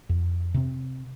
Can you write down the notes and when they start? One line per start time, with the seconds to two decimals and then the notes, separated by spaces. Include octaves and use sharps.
0.09 F2
0.54 C3 C4